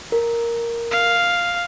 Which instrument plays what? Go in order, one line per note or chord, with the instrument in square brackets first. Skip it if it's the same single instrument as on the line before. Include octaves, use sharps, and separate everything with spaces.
[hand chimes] A#4
[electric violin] F5